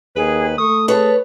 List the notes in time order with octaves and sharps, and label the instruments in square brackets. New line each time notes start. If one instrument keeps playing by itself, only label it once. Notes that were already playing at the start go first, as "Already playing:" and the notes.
[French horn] D#2 [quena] G#4 [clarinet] B4
[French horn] A3 [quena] C#6 [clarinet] D#6
[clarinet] G#4 [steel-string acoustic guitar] B4 C#5 [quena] A5